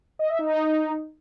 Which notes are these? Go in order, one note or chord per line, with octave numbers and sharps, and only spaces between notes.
D#5
E5
D#4